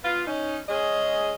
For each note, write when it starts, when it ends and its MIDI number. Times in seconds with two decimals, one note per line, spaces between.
0.04 0.27 59
0.04 0.27 65
0.27 0.59 61
0.27 0.59 63
0.69 1.34 56
0.69 1.34 61
0.69 1.34 68
0.69 1.34 75